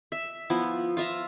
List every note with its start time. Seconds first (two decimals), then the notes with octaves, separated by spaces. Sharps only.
0.12 E5
0.50 F3 B3 E4
0.97 F4 E5 A#5